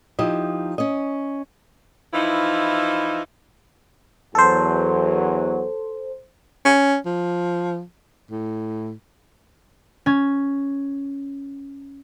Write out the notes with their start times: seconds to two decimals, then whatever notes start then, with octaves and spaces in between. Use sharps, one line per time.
0.19 F3 D#4 E4 G4 D#5
0.78 C#4 D#5
2.14 E3 F3 D#4 E4
4.35 E2 F#3 A4 C5
6.65 C#4
7.06 F3
8.31 A2
10.06 C#4 G#6